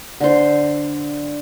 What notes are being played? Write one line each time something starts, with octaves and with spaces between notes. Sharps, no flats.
D3 C5